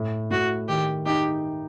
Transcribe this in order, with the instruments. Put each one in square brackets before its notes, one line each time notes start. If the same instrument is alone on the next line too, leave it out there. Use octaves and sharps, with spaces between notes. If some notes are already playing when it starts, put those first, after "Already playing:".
Already playing: [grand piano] A2
[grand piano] A2 [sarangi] F#4
[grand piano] D#3 [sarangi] G4
[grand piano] D#4 [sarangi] G4